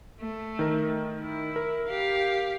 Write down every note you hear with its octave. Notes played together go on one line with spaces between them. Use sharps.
A3
D#3 A#4
E4
A#4
G4 F5